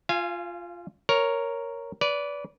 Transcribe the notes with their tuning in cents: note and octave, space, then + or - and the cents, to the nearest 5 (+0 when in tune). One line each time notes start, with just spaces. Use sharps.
F4 +0 F5 -30 G#5 +0
A#4 +0 C#5 +0
B4 -5 D5 -25